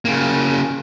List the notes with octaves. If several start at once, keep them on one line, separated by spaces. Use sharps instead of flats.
C#3 A#3